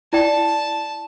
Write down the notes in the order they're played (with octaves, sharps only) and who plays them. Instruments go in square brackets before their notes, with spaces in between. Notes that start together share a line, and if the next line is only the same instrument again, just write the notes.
[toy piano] E4 D5 G5 [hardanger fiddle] A5